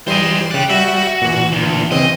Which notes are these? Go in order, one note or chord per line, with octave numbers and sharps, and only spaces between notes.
E3 G3 C5 D#5 C6
C#3 D5 G5 F#6
G3 F#4 E5
A#2 E3
D2
C#3 E3 C4 D#5